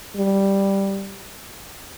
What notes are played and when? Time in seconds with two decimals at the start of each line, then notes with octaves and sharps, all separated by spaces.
0.16 G3